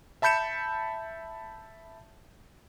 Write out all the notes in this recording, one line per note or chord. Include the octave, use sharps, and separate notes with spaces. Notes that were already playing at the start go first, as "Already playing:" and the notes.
E5 A5 B5 G6 C#7 E7